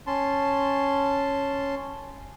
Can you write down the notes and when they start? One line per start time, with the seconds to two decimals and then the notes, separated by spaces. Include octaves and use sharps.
0.07 C#4 A5 C6